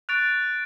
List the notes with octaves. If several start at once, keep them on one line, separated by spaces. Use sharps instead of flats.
C#6 F#6 A6 D7 F7